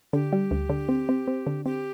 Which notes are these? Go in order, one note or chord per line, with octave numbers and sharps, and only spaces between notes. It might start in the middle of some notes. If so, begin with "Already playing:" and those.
D3 G4
G3
D2
D3
C4
C4
C4
D3
C4 G4